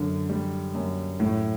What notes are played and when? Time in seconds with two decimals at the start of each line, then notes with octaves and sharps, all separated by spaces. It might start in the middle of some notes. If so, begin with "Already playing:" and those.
Already playing: F#2 D3
0.30 G3
0.75 F#2
1.20 A2